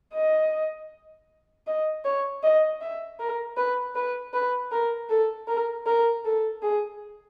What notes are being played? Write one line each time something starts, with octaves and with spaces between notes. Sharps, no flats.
D#5
D#5
C#5
D#5
E5
A#4
B4
B4
B4
A#4
A4
A#4
A#4
A4
G#4